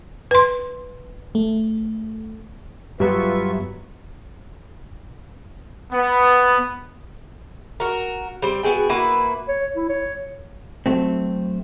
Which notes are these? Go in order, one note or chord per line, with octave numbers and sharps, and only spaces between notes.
B4 C6
A3
G2 F#3 B3 F4 G4 B4 E5 C#6
B3
F#4 A#4
G3 C4
B3 F#4 G#4 G5
A#3 E4 F#4 B4
C#5
E4
C#5
F#3 A3 C4